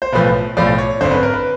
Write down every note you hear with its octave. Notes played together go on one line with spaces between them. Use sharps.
C5
B1 A2 F3 B4
B1 A2 F3 D5
C#5
G#1 F#2 D3 C5
B4
A#4
B4